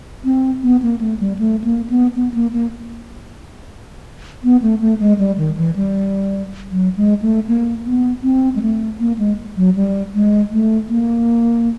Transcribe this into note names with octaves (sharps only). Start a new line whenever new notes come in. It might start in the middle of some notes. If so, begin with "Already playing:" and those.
C4
B3
A#3
A3
G3
A3
A#3
B3
B3
A#3
A#3
B3
A3
A3
G#3
G3
D#3
E3
G3
F#3
G#3
A3
A#3
B3
C4
G#3
A3
A#3
G#3
F#3
G3
G#3
A3
A#3